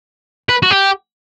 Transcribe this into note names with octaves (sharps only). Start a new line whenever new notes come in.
B4
F#4
G4